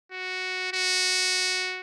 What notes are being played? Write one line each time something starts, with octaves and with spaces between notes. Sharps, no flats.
F#4
F#4